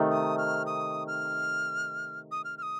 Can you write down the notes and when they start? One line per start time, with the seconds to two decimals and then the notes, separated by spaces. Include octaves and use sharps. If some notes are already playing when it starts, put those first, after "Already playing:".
Already playing: C3 D#3 A3 D#4
0.11 D#6
0.38 F6
0.66 D#6
1.07 F6
2.31 D#6
2.44 F6
2.57 F6
2.62 D#6